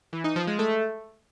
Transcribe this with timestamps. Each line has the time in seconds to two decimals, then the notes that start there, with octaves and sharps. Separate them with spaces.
0.13 E3
0.24 D#4
0.36 F3
0.47 G#3
0.59 A3